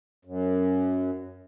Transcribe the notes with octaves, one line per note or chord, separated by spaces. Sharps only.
F#2